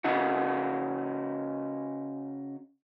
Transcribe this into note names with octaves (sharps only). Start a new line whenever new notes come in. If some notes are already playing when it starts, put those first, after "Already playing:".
C#3 D#4 F#4